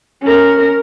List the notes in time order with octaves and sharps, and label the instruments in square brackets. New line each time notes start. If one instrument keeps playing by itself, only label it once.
[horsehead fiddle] C#4 A#4